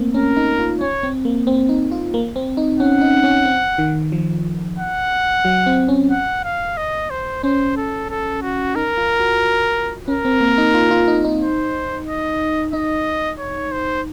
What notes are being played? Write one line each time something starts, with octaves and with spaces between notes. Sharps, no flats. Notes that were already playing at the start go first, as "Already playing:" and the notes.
Already playing: A3 A#3 C4
C#4 A#4
D#4
F4
C#4 C#5
C4
A#3
C4
D#4
F4
A#3
C4
D#4
C#4 F#5
D#4
C#4
C4
D#3
F3
F#5
F#3
C4
C#4
F#5
F5
D#5
C5
C#4 C5
A4
A4
F#4
D#4 A#4
F4
F#4
C#4 A#4
C4
A#3
D#4
F4
F4
D#4
D#4
C5
D#5
D#4 D#5
C#5
C5